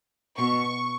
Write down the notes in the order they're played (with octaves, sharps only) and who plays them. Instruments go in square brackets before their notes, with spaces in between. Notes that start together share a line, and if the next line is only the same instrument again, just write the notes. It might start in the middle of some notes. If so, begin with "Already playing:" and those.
[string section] B2 C#6